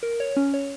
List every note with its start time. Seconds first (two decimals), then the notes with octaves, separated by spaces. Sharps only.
0.03 A#4
0.20 C#5
0.36 C#4
0.54 C#5